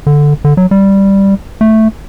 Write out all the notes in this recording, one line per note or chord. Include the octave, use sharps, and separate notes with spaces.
D3
D3
F#3
G3
A3